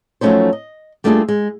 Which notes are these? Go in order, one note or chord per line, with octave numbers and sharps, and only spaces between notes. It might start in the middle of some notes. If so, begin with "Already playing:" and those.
F3 F#3 A3 C#4 D#4 C5
D#5
G3 A3 A#3 D4 F4 G#4
G#3